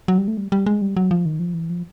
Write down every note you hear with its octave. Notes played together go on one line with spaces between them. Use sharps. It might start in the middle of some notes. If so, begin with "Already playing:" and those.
F#3
G3
A3
G3
G3
G#3
G3
F#3
F3
D#3
F3
E3
F3